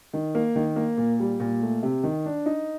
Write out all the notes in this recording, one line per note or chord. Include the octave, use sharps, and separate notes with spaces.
D#3
A#3
D#3
A#3
A#2
G3
A#2
A3
C3
D#3
D4
D#4